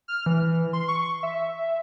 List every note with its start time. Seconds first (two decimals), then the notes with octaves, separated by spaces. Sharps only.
0.08 F6
0.26 E3
0.73 C6
0.88 C#6
1.23 E5